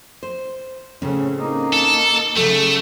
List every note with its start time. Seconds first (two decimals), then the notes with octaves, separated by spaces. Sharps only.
0.23 C5
1.02 A2 C#3 C4 C#4
1.38 A#3 D#4
1.73 A4
2.36 C#3 F#3 A3 A4 A5